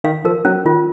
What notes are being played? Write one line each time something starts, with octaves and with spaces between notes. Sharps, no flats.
D#3 F5
F3 A#4
F#3 C#4
D#3 F4